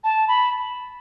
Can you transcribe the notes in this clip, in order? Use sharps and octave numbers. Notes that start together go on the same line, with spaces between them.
A5
B5